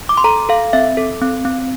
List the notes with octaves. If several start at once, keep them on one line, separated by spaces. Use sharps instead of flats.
D6
C6
A4 A#5
A4 F5
C4 E5
A4
C4
C4